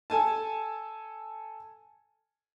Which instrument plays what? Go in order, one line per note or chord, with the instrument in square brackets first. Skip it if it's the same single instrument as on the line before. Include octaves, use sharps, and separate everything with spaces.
[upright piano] A4 G#5 A5